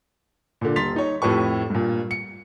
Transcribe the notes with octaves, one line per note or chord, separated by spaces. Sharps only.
A#2 D3
D#1 C6 A6 B6 F7
D#4 C#5
F2 A2 G4 B4 C#6
G2 A#2
C#7